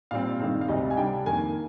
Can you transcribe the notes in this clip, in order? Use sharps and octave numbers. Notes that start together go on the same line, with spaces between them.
A#2 G3 C4 F5
G2 D#3 G#3 C4
F5
D2 C3 G3 C4 D#5
G#5
C3 G3 D4 G5
F2 D#3 A#3 G#5